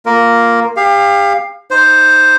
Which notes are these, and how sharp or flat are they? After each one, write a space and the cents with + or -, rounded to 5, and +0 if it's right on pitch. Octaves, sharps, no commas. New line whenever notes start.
A#3 +0 F4 +0 A#4 +0
G4 +35 F5 +0
D#4 +0 C5 +0